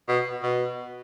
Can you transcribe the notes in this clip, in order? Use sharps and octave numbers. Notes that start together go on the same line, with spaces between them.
B2
B2